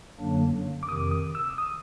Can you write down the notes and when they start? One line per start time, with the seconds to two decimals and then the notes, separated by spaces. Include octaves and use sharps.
0.19 F#2 D3 F#3 A#3 D4
0.83 D6
0.88 F2 C3 D#3 D#6
1.11 D#6
1.35 E6
1.58 D#6